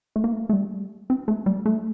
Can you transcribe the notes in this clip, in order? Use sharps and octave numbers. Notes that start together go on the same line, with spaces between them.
A3
A#3
A3
A3
G3
C4
A3
G3
A3